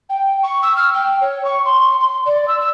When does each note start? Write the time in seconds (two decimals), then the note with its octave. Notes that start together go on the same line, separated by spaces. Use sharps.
0.09 G5
0.43 C#6
0.62 E6
0.76 F6
0.94 G5
1.21 C#5
1.44 C#6
1.65 C6
2.00 C6
2.25 D5
2.47 E6
2.60 E6